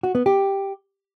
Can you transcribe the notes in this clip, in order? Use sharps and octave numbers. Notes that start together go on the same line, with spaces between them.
F#4
B3
G4